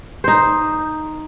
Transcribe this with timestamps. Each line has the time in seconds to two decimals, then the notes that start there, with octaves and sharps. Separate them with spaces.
0.24 D#4 C5